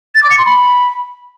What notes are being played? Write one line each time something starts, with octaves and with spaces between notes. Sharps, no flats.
A6
D6
C#7
C6
B5